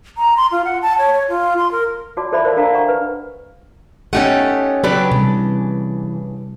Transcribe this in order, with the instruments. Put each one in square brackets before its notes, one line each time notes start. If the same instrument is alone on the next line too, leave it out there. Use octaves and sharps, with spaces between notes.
[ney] A#5
C6
F4
F#5
A5
C#5
C#5
F4
C6
A#4
[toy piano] F4 F#4 C#5 D5 A5 D6
E4 A4 C5 D5 E5 B5
A#4 C5 D5 E5 F5 A5
D4 A4 A#4 D5 F5 A#5
D5 F#5 G#5 A#5 C#6
B4
[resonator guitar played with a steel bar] A3 D#4 A4 [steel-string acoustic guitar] C#4 G4 F#5
[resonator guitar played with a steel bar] C#3 D4 B4 [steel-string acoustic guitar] F#3 G4 A4
[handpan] C3 G3 [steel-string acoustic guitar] E3